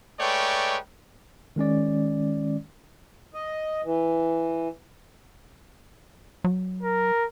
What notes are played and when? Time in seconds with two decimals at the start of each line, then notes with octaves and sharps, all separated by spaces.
0.19 G#3 A3 B4 C#5 D5 G5
1.56 D#3 G#3 C#4 D5
3.34 D#5
3.84 E3
6.44 F#3
6.82 A#4